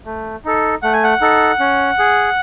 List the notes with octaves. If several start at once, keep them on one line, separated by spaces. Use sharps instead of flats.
A3
D#4 A4
A3 F#5
G#5
F#5
D#4 A4
C#4
G#4